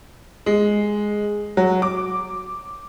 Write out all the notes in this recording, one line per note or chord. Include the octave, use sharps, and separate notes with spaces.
G#3
F#3
D6